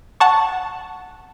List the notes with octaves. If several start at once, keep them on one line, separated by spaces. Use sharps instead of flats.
F#5 A5 C#6